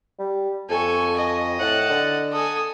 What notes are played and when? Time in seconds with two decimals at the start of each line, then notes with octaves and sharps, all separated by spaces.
0.19 G3
0.70 F2 A4 G#5 C#6
1.17 D#5
1.59 A2 F#5 A5
1.90 D3
2.32 A4 G#5 D#6